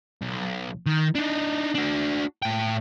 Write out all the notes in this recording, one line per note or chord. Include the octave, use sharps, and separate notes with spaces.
B1
D#3
D4 D#4
D4 F#4
A2 G5